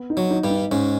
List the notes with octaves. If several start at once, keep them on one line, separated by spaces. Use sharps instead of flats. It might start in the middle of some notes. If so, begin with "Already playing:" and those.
Already playing: B3
D#4
F#3
D#4
G2 G3
D#4
G#2 G#3 C#4